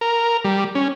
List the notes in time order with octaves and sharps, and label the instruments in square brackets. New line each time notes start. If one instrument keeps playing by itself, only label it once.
[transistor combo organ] A#4
G3
C#4